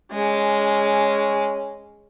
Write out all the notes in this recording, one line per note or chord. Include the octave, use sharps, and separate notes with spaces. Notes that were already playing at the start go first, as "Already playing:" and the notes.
G#3 C#4